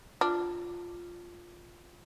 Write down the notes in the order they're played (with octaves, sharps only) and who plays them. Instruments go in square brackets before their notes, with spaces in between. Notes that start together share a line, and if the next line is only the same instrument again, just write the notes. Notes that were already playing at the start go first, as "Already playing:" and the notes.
[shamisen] D4 [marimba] F4